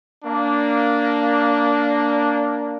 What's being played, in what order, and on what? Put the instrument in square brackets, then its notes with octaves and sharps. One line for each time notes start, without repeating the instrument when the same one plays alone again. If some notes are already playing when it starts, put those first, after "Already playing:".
[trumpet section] A#3 D4